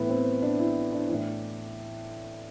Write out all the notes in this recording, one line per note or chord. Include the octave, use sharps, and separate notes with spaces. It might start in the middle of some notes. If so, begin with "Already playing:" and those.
Already playing: A2 E3 B3
C4
D4
E4
D4
A2 E3